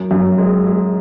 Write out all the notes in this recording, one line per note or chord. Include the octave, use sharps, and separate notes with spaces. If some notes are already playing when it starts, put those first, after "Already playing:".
Already playing: F#2
F#2
G#3
G#3